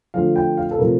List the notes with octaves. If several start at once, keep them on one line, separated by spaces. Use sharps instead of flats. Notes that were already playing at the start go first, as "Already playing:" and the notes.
D3 F3 A3 F5
G5
F5
A4
C3 F3 A3 A#4